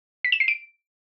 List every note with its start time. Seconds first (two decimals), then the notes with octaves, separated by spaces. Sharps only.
0.25 B6
0.32 E7
0.40 C7
0.48 D7